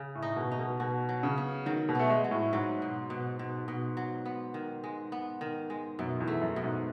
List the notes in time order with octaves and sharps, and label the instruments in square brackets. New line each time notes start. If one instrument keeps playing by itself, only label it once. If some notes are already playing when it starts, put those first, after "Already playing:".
Already playing: [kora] C#3
[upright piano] A2
[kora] D#4
[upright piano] B2
[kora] D#4
[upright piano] B2
[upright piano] B2 [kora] F#4
[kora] F#3
[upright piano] C#3
[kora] B3
[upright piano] D#3 [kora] F#3
[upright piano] B2
[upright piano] A3 [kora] B3
[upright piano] G#3
[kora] F#3
[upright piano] A2
[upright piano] G#2 [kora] F#3
[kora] B2
B2
B2
B2
F#3
B3
D#3
G#3
B3
D#3
G#3
[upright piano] F#2 [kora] B2
[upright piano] E2
[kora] A3
[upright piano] F#2
[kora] B2
[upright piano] G#2